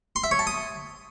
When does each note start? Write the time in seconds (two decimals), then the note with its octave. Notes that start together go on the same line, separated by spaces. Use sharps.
0.16 C6
0.24 E5
0.31 C#5
0.39 A5
0.47 D#6